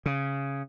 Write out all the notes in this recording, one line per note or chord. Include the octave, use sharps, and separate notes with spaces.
C#3